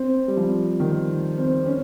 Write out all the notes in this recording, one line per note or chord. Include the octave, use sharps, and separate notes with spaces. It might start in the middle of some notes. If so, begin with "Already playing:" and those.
Already playing: C4
G3
F3
D#3
C4
C#4